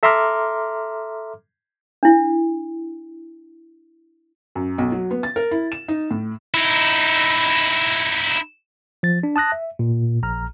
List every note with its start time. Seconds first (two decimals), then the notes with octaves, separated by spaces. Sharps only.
0.03 A4 E5 A#5 C6 D6 F6
2.03 D4 E4
4.55 F#2
4.78 B1
4.92 F#3
5.11 B3
5.23 A6
5.36 A#4
5.51 E4
5.72 E7
5.88 D#4
6.11 A2
6.54 D#4 E4
9.03 F3 A6
9.23 D4
9.36 A5 D#6 F#6 A#6
9.52 E5
9.79 A#2
10.23 A#1 A#5 F6